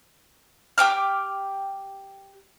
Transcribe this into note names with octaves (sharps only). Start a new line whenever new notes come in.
G4 G5 D6 F6